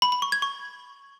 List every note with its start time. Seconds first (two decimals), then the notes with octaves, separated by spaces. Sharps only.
0.02 B5
0.12 B5
0.22 C#6
0.32 G#6
0.42 C#6